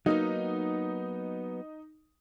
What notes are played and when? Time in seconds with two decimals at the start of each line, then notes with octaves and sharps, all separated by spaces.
0.06 F#3 A#3 B3 D#4